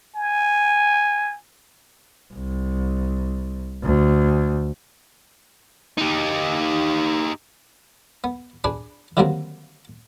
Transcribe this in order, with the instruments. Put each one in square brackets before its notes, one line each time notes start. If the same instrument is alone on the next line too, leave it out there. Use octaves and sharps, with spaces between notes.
[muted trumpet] G#5
[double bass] C2
D2
[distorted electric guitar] D#4 G4
[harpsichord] B3
D4 G#4 B4 G#5
D3 D#3 F#3 G3 A#3 C4